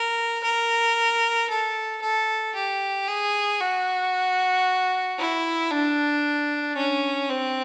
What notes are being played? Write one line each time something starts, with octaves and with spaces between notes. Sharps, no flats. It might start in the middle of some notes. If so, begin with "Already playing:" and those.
Already playing: A#4
A#4
A4
A4
G4
G#4
F#4
E4
D4
C#4
C4